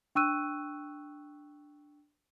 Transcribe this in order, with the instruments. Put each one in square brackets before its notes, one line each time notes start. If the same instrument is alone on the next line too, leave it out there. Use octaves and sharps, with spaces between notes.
[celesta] D4 G5 C#6 E6 F#6 D#7